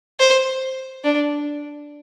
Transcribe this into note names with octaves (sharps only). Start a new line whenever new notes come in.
C5
D4